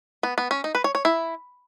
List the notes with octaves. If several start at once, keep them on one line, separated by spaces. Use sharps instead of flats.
B3
B3
C#4
D#4
B4
C#5
C#5
E4